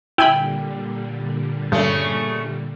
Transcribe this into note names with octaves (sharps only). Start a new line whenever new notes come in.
A#2 D3 G3 E4 G5 G#5 B5
G2 C#3 A3